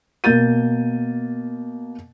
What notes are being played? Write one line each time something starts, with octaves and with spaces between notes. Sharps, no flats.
B2 A#3 G6 A6 D#7